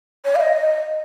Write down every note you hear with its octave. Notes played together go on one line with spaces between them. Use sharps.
C#5
F5
D#5